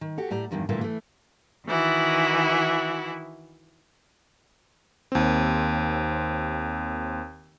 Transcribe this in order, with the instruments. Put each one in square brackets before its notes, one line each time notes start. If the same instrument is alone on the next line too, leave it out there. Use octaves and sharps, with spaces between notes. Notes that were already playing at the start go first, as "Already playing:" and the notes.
[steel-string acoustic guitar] D#3
F#4 G4 A4
A2 G4 D5 A#5
E2 G2 D#3 F3
G2 A#2 D3 E3 A3 A#3
E3 A3
[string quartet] D#3 E3 E4 F#4
[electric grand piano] D#2 C4